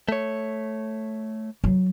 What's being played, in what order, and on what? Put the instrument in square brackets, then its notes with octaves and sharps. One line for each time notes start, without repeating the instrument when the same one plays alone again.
[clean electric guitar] A3 C#5
[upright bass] F#3